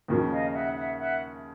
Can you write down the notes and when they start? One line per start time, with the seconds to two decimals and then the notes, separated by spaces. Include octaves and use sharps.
0.08 D#2 C#3 F3
0.31 D#5 F5
0.53 E5 F#5
0.75 E5 F#5
0.98 E5 F#5